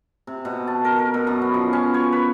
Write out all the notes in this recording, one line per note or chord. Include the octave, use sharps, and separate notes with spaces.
C3
B2
A5
A#4
A#4
B2
F#2
B3
F3
C#4
C#5
B4